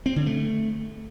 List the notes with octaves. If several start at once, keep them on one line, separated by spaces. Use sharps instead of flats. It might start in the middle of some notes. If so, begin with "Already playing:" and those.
C4
D3
A3